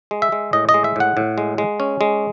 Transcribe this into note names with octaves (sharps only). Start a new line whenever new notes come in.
G#3
E5
G#3
A2 D#5
D#5
G#3
E5
A2 F#5
A2
G#3
G#3
C#4
G#3